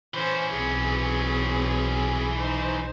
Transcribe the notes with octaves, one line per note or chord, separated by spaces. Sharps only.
E3 C#4 C5
B1 C4 G#4
D#4 C5